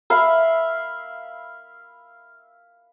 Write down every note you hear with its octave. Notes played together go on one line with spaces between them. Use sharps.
E5 F5 B5